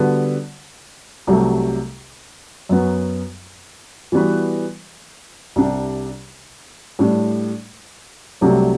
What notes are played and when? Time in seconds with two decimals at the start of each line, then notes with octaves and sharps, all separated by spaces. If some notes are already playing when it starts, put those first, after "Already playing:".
Already playing: D3 G3 B3 F#4
1.27 C2 C3 F#3 A3
2.69 F#2 F#3 B3 F#4
4.12 E3 G3 B3 F#4 B4
5.56 C2 C3 G3 D4
6.99 A2 G3 D4
8.41 C2 C3 F#3 A3 D4